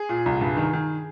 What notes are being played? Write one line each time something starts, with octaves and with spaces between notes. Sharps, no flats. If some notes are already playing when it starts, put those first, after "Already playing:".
Already playing: G#4
A#2
C2
G2
D#3
D#3